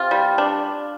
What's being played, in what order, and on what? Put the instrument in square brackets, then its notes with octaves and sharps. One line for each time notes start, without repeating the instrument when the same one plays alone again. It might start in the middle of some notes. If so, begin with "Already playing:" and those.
Already playing: [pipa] C3 F4
G3
D4